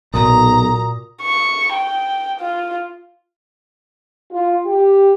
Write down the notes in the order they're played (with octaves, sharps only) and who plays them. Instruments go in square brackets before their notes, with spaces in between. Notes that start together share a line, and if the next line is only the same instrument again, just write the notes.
[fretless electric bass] B1 [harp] A#2 [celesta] F#4 A#4 D#6 [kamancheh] A#5
[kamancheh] C#6
G5
F4
[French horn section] F4
G4